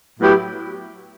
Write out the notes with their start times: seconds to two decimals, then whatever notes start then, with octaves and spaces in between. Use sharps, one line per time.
0.20 A2 F#3 B3 E4 G4